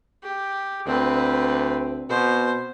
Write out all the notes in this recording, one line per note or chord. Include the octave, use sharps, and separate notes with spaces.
G4
D2 C4 B4
B2 C5